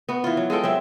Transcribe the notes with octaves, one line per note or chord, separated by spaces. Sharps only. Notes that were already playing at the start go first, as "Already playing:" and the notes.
B3 F#4
E3 F4
F#3
G#3 F4 A4 G5
F#3 C4 E5